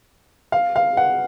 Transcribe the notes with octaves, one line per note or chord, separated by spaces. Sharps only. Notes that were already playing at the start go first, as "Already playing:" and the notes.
F5
F5
F#5